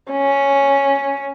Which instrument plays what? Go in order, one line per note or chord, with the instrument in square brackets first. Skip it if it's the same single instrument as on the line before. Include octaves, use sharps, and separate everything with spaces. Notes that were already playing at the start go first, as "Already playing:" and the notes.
[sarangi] C#4